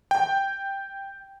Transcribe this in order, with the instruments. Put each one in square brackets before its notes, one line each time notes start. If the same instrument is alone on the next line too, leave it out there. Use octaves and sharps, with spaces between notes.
[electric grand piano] G5